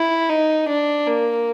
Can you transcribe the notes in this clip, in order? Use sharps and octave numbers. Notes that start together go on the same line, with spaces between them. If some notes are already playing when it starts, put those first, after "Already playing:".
Already playing: E4
D#4
D4
A#3